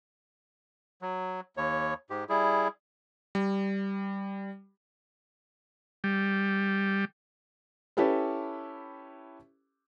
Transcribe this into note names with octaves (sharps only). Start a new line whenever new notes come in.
F#3
D#2 C#5
G#2 G4
G3 E4 G#4
G3
G3
C#4 E4 G4 A4 B4